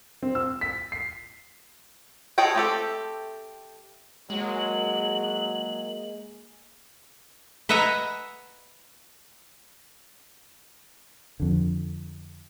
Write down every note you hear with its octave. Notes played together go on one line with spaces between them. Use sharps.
C4
E6
B6
C7
G#4 A4 C#5 D#5 G5
A3 C4 G4 A4
F#3 G#3 A#3 G#4 F#7
B4 D#5 E5 F#5 G#5 A#5
F2 D3